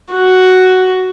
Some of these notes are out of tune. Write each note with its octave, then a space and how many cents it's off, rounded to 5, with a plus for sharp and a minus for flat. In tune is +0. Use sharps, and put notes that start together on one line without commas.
F#4 +5